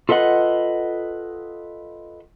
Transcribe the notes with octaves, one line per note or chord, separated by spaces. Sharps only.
F4 A4 B4 D#5 F#5